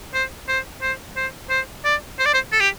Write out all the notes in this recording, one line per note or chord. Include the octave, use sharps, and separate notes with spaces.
C5
C5
C5
C5
C5
D5
C5
D5
C5
A4
G4